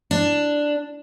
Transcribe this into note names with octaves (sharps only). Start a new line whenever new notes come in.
D4